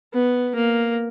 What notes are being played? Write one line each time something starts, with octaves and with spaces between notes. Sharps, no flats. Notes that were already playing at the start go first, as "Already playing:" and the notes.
B3
A#3